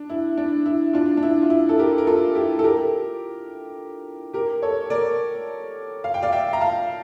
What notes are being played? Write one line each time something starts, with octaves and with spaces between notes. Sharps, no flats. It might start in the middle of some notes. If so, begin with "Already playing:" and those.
Already playing: D4
E4
D4
E4
D4 F4
D4
E4
F4
E4
A4
G4 A#4
A#4
F4 A4
E4 G4
A4
G4 A#4
G4 A#4
A4 C#5
A#4 D5
F5
G5
D5 F5
E5 G5
A#5
F5 A5